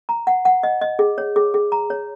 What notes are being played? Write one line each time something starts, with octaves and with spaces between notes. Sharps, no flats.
A#5
F#5
F#5
D#5
D#5
G#4
C#5
G#4
G#4
A#5
C#5